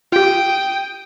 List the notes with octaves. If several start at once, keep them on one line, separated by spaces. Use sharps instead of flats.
F4 G4 G5 D#6